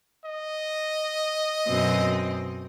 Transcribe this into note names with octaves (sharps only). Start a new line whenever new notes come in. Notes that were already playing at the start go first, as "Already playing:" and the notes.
D#5
F#2 B2 C4